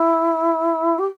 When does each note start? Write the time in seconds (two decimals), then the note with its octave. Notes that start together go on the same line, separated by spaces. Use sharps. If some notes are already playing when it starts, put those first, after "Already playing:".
Already playing: E4
0.98 G4